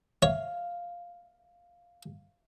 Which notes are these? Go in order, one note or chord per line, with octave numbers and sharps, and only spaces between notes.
C#5 F5